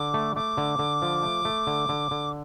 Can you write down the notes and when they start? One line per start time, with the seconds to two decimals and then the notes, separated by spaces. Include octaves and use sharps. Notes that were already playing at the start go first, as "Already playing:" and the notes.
Already playing: D3 D6
0.14 A3
0.35 A3 D6
0.57 D3
0.79 D3
1.02 F3
1.23 A3
1.45 A3
1.67 D3
1.89 D3
2.11 D3